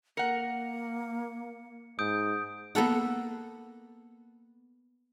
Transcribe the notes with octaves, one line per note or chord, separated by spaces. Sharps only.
A#3 A#4 F#5 C#7
G#2 D#6 G6 D7
A#3 B3 A4 F#5